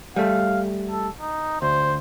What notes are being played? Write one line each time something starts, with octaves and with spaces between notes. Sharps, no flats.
G3 A3 F5
A4
D#4
D2 C5